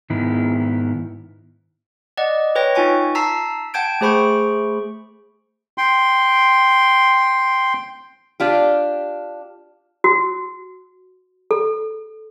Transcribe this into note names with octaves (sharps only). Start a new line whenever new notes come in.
G#2 D#3 B3 E4
D5 D#5 F#5
B4 C#5 G5 A#6
D#4 F4 G#5 C#6
A5 A#5 E6 B6 C7
F#5 G5 A5 G6 G#6 D7
A3 G#4 C5 B5 C#6 D7
G5 C6
D4 F4 G4
F#4
A4